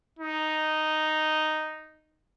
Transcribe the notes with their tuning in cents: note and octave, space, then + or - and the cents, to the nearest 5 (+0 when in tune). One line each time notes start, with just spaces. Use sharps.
D#4 -5